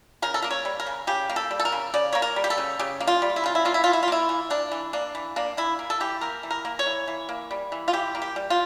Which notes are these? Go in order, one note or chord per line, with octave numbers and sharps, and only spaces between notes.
C#3 A#4
A4
A#3 A#4
C#5
G3
A#4
C#3
C#3 G4
A#3
A4
G3
A4
A#4
C#3
C#3 D5
A#3 C#5
A#4
G3
G4
A4
C#3
C#3 G4
A#3
F4
G3
E4
C#3 F4
E4
A#3 F4
E4
E3 F4
E4
F4
A#3 E4
E3
A#3 D4
E3
A#3 D4
E3
A#3 D4
E3 E4
A#3
A4
E3 G4
A#3 A#4
E3
A#4
A#3
C#5
E3
E3
A#3
G3
E3
F4
E3 G4
A#3
G4
G3
F4